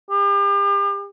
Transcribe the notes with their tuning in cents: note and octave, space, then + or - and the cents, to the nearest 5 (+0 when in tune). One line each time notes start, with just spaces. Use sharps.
G4 +40